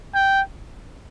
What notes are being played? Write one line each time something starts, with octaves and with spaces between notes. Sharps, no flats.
G5